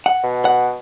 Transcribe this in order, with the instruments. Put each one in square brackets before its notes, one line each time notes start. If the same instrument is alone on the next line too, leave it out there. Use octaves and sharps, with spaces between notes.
[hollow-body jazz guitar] F#5
[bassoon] B2
[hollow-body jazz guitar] F#5